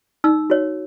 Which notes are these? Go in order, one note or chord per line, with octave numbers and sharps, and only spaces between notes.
D#4 E6
F#4 C#5